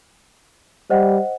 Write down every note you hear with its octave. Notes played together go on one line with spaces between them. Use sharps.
G3 C5 D#5 F#5